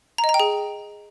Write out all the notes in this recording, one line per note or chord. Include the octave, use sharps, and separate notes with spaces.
A#5
D#5
A#5
G5
G#4